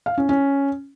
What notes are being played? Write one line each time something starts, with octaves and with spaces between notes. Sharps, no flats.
F5
C#4
C#4